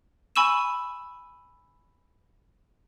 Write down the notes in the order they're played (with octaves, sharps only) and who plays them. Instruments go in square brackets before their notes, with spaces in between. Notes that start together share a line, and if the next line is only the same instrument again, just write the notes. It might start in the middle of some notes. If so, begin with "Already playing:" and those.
[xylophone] G#5 B5 C#6 E6 D#7 E7